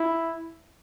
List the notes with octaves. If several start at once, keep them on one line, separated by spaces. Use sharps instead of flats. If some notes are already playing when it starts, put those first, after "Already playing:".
Already playing: E4